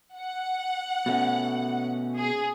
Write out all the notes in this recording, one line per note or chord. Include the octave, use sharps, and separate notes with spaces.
F#5
B2 A3 C#4
G#4